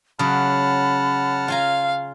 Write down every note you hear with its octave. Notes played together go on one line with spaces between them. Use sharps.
C#3 F#3 F#5 A5 B5 F6
F4 F5 G#5 A#5